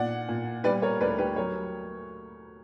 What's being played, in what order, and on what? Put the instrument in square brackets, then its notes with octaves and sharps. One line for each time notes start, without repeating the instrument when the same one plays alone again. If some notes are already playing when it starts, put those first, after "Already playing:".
Already playing: [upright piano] A#2 D5 F#5
A#2
G3 B4 D5
A#4 C#5
D2 B4 D5
G4 B4
F#3 A#4 C#5